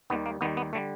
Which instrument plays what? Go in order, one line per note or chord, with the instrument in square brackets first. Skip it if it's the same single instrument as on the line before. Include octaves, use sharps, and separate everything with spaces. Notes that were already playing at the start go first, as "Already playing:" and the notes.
[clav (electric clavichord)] D#2 D#3 G3 B3
A#3
D#2 D#3 G3 B3
B3
D3 G3 A3